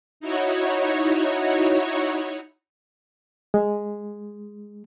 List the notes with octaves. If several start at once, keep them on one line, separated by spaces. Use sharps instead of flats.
D#4 E4 F#4 C#5
G#3